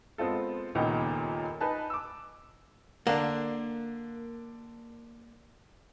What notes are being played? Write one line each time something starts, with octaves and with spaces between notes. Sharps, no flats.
G#3 B3 C4 F4 A4
D#1 C#2 A#2 D#3 B3 G5
D#4 B4 G#5 A5
D6 E6
D3 A#3 D4